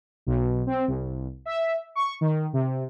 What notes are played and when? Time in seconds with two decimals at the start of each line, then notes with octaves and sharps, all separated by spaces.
0.27 B1
0.67 C4
0.88 C2
1.45 E5
1.95 C#6
2.21 D#3
2.53 C3